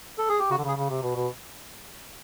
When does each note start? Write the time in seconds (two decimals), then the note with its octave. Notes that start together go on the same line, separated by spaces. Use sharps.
0.18 A4
0.29 G#4
0.39 G4
0.50 C#3 F#4
0.58 D3
0.64 C#3
0.68 G#4
0.77 C#3
0.89 C3
1.02 B2
1.15 B2